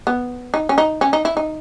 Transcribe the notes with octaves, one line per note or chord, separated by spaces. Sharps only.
B3
D#4
C#4
D#4
C#4
D#4
E4
D#4